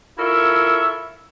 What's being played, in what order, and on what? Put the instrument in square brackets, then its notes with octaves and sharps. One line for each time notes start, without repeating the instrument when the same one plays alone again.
[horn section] E4 F4 A4 A#4 C#5 E5